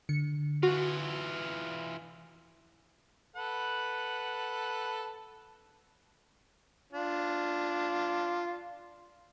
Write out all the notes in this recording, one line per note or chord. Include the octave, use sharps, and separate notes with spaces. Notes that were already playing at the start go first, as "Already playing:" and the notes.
D3 C#7
E3 F4 F#4
A4 B4 F#5
D4 F4